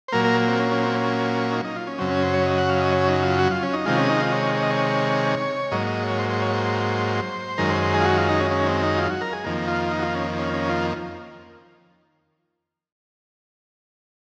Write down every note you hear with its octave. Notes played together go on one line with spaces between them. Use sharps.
C5
A#2 F#3 A#3 A#4
A#4
C4
C#4
C#4
C4
C#4
D#4
D#4
F4
C#4
F#2 C#3 F#3 C4
C#4
C5
C#5
D#5
F#5
F5
D#5
C#5
D#4
F4
F#4
F4
C#4
D#4
C3 D#3 G#3 F4
C#4
D#4
F4
C#5
C#5
D#5
C#5
G#2 F#3 A#3 D#5
D#5
C#5
C5
C5
C#5
C5
F#2 D#3 G#3 A#4
C5
C5
G#4
F4
F#4
F4
D#4
C#4
C#4
C4
D#4
F4
F#4
A#4
G#4
F2 D#3 A#3
F4
D#4
F#4
F4
C#4
C#4
C#4
F4